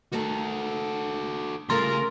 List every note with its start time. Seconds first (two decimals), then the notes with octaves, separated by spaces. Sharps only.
0.12 D#3 A3 F#4 A4 A#5
1.70 C#3 G3 A3 F4 A#4 C6